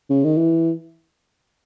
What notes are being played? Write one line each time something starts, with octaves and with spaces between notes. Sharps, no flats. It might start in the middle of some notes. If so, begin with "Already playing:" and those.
C#3
D#3
E3